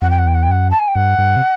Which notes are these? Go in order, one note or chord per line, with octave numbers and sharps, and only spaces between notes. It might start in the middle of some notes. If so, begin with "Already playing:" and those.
F2 F#5
G5
F#5
E2 G5
F#5
G5
F#2 F#5
A5
G#5
G5
G2 F#5
G2
C3